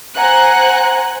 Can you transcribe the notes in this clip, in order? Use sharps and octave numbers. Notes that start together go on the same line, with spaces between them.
C5 F#5 G#5 A#5 F#6